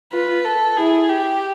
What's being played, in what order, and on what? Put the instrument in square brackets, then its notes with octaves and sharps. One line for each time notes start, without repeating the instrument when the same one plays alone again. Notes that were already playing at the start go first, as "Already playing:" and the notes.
[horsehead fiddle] F4 [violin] B4
[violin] A4
[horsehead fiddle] E4 [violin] G#4
[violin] G4